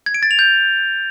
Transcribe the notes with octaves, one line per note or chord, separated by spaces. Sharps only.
G#6
D7
A6
F7
G6